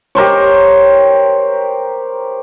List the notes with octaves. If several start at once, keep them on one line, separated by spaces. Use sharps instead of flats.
G4 A#4 C5 C#5